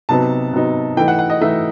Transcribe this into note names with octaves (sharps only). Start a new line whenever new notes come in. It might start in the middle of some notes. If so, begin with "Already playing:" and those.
C3 F#3 B3 D#4 A5
C3 F#3 B3 D#4
E3 A3 D#4 G5
F#5
F#5
D#5
E3 A3 D#4 E5